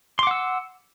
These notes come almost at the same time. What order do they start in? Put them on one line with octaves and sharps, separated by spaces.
C6 D6 F#5 E6